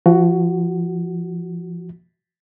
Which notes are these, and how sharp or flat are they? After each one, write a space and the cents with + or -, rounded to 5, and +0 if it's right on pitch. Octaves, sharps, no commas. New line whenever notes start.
F3 -25 F#4 +10